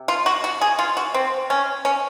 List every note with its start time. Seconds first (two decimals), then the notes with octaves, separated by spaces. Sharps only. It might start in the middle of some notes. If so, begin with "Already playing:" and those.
Already playing: C3
0.08 F4
0.26 F#4
0.44 F#4
0.61 G#4
0.79 F4
0.97 F#4
1.14 C4
1.50 C#4
1.85 C#4